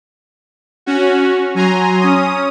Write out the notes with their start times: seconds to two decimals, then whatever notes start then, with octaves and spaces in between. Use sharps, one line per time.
0.86 C#4 F#4
1.55 F#3 G#5 A#5 C6
2.00 C#4 D#6